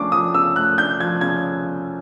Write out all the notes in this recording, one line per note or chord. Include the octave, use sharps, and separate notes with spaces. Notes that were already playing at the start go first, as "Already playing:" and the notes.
Already playing: C#3 F3 A3 D4 C#6 D6
F3 D#6
C#3 E6
A3 F#6
D4 G6
F3 G#6
C#3 G#6